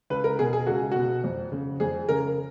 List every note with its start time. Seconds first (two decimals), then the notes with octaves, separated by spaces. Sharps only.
0.10 C#2 B4
0.24 A#4
0.39 B2 G#4
0.53 G#4
0.67 C#2 F#4
0.92 B2 F#4
1.24 F2
1.52 C#3
1.80 F2 G#4
2.09 C#3 A#4